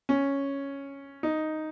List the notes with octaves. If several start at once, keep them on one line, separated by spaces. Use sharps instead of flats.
C#4
D#4